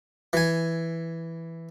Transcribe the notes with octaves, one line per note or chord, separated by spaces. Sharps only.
E3 G#5